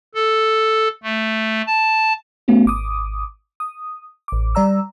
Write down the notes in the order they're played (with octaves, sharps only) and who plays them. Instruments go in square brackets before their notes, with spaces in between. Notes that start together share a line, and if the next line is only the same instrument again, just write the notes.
[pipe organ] A4
A3
A5
[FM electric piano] A3 B3 C#4 F#4
G#1 D6 D#6
D#6
A1 D6
G3 D5 A#5 E6